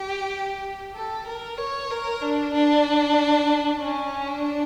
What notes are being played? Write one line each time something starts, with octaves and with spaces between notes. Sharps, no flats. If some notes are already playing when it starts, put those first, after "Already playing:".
Already playing: G4
A4
A#4
C#5
A#4
D4
D4
C#4
D4